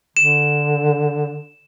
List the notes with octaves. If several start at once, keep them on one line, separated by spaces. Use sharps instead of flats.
D3 E7